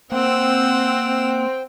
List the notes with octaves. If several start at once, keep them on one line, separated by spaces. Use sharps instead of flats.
A#3 C4 C5 F#5 G5 E6